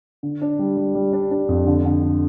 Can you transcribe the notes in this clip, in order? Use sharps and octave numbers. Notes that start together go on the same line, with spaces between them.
D3
D4
G3
G3
G3
D4
D4
F2
D3
D3
D3